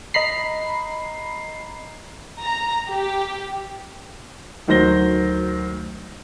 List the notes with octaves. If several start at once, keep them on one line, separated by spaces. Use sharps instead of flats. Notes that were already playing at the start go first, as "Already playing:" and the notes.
D#5 A#5 B5 C7
A#5
G4
D2 D#3 F#3 C5 A#6 G7